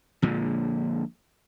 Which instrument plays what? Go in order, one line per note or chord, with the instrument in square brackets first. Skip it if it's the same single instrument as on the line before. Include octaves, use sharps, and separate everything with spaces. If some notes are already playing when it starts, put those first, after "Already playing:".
[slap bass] A#1 A#2 D3 G#3